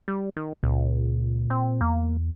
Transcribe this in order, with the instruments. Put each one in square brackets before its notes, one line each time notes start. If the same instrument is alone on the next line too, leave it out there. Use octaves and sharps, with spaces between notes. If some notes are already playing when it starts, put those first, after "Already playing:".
[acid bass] G3
D#3
[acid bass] C#2 [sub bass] A#2
[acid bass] C4
[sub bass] E2 [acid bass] A#3